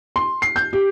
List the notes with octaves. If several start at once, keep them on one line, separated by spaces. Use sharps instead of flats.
C6
C7
G6
G4